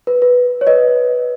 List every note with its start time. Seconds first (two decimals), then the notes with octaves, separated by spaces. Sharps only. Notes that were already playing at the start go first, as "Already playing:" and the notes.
0.07 B4
0.22 B4
0.61 C#5
0.67 B4 D#5